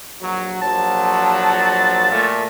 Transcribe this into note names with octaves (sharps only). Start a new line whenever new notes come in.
A#1 F#3
A#1 F3 F#3 A5
A#2 A3